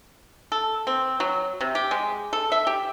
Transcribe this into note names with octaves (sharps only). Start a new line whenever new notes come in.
A4
C4
F#3
C3
G4
G#3
A4
E5
G4